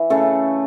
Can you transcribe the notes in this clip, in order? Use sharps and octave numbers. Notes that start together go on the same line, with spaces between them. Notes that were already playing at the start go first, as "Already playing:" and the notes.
Already playing: E3
C#3 A3 A4